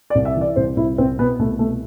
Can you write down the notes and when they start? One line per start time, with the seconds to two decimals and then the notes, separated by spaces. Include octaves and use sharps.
0.10 D5
0.15 C2
0.25 E5
0.36 E3
0.41 D5
0.56 C2 C5
0.76 C2 E4
0.98 C2 C4
1.19 B2 B3
1.39 C2 A3
1.59 B2 A3